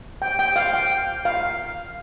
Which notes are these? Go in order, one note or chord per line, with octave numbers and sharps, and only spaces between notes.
G5
G5
F5
G5
F5